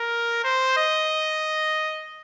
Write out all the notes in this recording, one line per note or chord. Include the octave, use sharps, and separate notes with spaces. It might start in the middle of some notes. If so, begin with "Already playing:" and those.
Already playing: A#4
C5
D#5